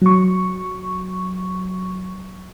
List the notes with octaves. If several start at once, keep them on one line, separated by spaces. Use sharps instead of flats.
F#3 C#6